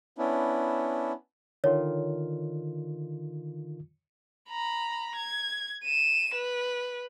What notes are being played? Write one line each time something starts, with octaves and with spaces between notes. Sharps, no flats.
B3 C#4 D4 E4
D3 D#3 F4 C#5
A#5 B5
G#6
D#7 E7
B4